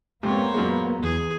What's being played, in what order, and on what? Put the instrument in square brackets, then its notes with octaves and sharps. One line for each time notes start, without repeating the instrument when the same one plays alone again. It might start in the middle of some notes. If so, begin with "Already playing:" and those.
[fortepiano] F2 G#2 C3 [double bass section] A#3 B3 [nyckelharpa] C5 C#5
[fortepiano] F#2 A#2 G#3
[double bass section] E2 [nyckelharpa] G#4